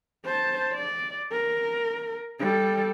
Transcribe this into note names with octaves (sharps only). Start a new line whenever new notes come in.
C5 A5
D5
A#4
G3 A4